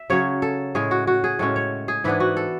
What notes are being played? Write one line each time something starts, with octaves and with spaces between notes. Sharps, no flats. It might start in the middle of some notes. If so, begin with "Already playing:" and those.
Already playing: E5
C#3 F#3 C#4 C#5
A4
A2 G#3 C#4 G#4
F#4
F#4
G#4
A2 G#3 C#4 A4
C#5
G#4
G#2 E3 B3 D4 E4
F#4
A4